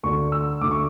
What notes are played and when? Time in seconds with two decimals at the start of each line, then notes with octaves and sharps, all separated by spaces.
0.03 D2 D3 A3 C#6
0.32 E6
0.61 D2 D3 A3 D6
0.71 C#6